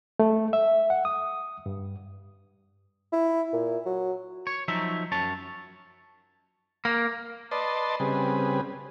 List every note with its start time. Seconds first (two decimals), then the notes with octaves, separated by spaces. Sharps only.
0.19 A3
0.53 E5
0.90 F#5
1.05 D#6
1.66 G2
3.13 E4
3.53 A#2
3.86 F#3
4.47 C#5
4.68 F3 F#3 D#4 E5
5.12 F#2 C#5 A5
6.85 A#3
7.51 B4 D5 D#5 A5 C6
8.00 C#3 G3 C4 G#4 B4